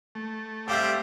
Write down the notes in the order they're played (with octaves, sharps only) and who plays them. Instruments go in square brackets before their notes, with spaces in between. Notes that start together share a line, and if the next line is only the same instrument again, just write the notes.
[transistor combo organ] A3
[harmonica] G3 C4 G4 [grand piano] E5 F5 G5